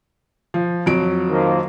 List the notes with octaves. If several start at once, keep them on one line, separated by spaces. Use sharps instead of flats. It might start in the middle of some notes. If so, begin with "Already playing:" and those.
F3
F2 F#3 D7
D#3 F3 A#3